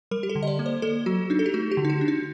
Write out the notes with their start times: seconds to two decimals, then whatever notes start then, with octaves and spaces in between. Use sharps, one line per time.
0.11 G3 A#4
0.23 G4
0.30 A4
0.35 D3
0.43 D#5
0.47 D5
0.59 A#3
0.66 C5
0.82 A#3 A4
1.06 F#3 F#4
1.30 D4 D#4
1.39 A4
1.46 G4
1.54 A3 F#4
1.72 G4
1.77 D3
1.85 D#4
1.90 F#4
2.01 D4
2.08 D#4